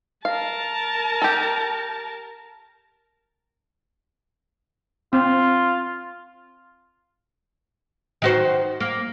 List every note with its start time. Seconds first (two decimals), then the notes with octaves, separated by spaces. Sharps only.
0.25 A#4 F5 A5
1.22 G4 A4
5.13 C4 F4
8.22 D#3 F#4 C5
8.80 A#3